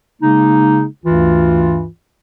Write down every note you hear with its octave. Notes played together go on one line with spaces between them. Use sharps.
C#3 G#3 A#3 D#4
D2 G2 E3 F4